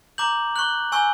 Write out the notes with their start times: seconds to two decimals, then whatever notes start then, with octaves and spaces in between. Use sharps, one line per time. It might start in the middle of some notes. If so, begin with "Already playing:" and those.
0.18 A#5 D6 G6 F#7
0.56 C#6 F#6 F#7
0.92 G#5 C#6 E6 G6